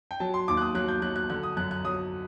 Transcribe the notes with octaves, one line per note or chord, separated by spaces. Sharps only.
G5
F#3 A5
C6
D#2 D6
F#6
D#6
F#3 F#6
G6
F#3 F#6
F#6
D3 F#6
D#6
F#2 F#6
F#6
F#3 D#6